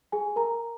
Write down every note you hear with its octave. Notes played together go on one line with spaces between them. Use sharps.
G#4 G#5
A#4 A#5